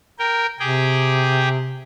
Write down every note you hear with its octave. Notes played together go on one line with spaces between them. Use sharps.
A#4 G5
C3 G4 G#4 G5